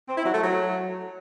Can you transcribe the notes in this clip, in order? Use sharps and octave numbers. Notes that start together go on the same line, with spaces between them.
C4
E4
F#3
A3
F#3